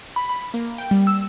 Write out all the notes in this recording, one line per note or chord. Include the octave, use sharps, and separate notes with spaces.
B5
B5
A#3
G5
G3
E6